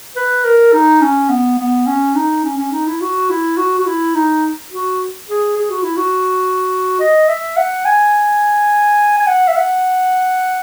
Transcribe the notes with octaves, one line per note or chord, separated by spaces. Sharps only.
B4
A#4
D#4
C#4
B3
B3
C#4
D#4
C#4
C#4
D#4
E4
F#4
E4
F#4
F#4
E4
D#4
F#4
G#4
G#4
F#4
E4
F#4
D#5
E5
F#5
G#5
G#5
F#5
E5
F#5